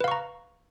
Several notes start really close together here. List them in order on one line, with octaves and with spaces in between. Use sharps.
B4 F5 C#6 A#5